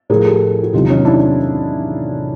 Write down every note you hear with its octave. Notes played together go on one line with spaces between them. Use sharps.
A2 F3 G#4 A#4
G4 A4
F#4
E2 C3 D#3 F#3 F4 G4
C#4 D#4
D4 E4